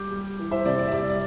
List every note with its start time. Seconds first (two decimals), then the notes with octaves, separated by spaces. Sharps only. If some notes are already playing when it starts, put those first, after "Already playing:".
Already playing: G3 D6 G6
0.11 G3
0.39 E3
0.51 C5 E5
0.65 C3 D5
0.79 D5
0.87 E5
0.92 G3 D5
1.10 D5